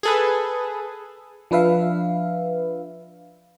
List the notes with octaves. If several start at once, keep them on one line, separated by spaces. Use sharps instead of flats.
G#4 A4 B4
F3 D4 B4 E5 F5